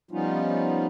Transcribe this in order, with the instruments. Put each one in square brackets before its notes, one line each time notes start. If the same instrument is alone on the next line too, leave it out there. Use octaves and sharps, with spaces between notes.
[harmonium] F3 G3 B3 C#4 D#4 F4